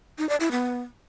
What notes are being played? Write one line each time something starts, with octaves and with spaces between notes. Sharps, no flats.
D#4
D5
E4
B3